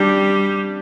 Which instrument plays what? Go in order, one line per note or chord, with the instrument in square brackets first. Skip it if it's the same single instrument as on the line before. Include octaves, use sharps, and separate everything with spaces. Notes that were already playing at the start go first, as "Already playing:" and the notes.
Already playing: [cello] G3 [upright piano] D4 G4